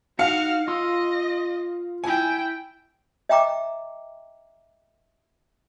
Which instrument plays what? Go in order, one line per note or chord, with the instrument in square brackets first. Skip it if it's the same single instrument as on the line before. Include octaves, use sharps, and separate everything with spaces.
[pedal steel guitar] D#4 [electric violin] F#4 F6 [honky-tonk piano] F5 C#7
[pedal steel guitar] F4 C6 E6 [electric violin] D#5
[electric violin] E4 G5 [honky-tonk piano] G#5
[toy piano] D#5 E5 G5 A#5 D6